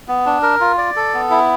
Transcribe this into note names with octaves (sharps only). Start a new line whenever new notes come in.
B3
D4
A#4
F4
D5
A4
B3
E4